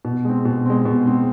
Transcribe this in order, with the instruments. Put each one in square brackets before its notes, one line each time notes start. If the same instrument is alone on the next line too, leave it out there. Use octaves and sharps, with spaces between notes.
[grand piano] B2
G#3 C4
B2
G#3 C4
B2
G#3 C4